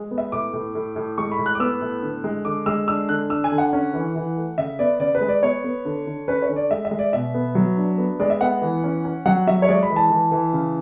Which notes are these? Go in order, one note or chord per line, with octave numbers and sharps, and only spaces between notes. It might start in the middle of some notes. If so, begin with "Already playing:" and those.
Already playing: G#3
B3
E5
A2 D6
A2
A2
A2
G#3 C#6
B5
A2
F#6
D6
B3 E6
A2
D3
G#3
D3 D6
G#3 E6
D4 E6
D3 F#6
D4 E6
G#5
D3
F#5
C#4
E3
E3
A3
C#3 E5
B3 D5
C#3 D5
B4
G#3
D5
B3 C#5
B3
D3
D3
C#4 B4
C#5
D3
D5
G#3 E5
E5
G#3
D5
B2 E5
B3
F#3
D4
B3
G#3 D5
E5
B3 F#5
E3
C#4
C#4
F#3 F#5
F#3 E5
C#5
G#3 D5
B5
E3
A5
E3
E3
C#3